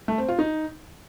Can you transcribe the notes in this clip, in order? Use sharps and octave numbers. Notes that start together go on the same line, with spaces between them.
A3
C4
F4
D#4